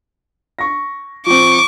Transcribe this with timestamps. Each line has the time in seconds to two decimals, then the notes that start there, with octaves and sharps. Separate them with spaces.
0.59 C#6 A#6
1.26 F3 C4 C#6 D6